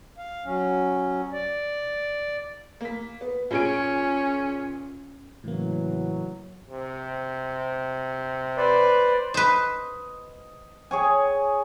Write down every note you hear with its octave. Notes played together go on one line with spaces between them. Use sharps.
F5
F#3 C#4
D5
A#3 B6
B3
A#2 C#4 G#4 D7
A2 C#3 E3 F#3 A#3
C3
B4 C5 D5
B4 C5 D#5
G#4 C#5 G#5